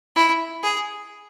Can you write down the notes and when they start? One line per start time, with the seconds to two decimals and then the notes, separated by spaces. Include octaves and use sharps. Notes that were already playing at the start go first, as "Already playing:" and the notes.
0.16 E4
0.63 G#4